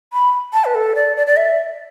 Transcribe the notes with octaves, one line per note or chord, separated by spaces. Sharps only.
B5
A5
B4
A4
D5
D5
D5
E5